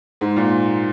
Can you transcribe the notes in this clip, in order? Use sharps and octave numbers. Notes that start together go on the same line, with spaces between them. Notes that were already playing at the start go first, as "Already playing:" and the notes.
G#2
A#2